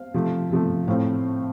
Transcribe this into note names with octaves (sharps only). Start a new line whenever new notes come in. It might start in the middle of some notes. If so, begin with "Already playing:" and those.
Already playing: C5 F5
C3 F3 A3
C3 F3 A3
A2 A3 C4 C5 F5